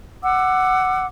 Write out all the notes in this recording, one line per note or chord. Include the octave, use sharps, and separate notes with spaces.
F#5 D6 E6